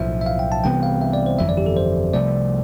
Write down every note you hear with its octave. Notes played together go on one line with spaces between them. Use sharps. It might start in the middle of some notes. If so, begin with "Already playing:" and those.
Already playing: B1 A2 F3 E5
E5
F5
G5
A5
C2 C3 E3 B3 G5
F5
E5
D5
C5
G1 F2 E3 E5
D5
G4
A4
C5
C2 C3 F3 A3 D5